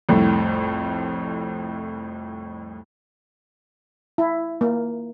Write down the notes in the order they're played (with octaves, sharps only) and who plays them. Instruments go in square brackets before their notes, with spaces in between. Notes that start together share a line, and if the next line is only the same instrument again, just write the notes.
[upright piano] C2 F2 A2
[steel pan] E4
A#3